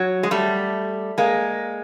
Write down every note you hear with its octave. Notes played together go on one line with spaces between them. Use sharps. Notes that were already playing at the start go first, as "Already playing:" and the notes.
Already playing: F#3
G#3
G3 A3
G#3 A#3